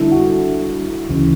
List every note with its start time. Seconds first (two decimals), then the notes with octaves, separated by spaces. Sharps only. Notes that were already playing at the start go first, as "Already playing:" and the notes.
Already playing: D3 G3 D4 E4 A4 E5
0.12 F#4
1.10 D2 C#3 E3